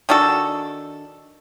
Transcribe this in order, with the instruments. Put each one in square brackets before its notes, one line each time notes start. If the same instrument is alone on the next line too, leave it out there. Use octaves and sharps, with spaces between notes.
[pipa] D#3 D4 F#4 A4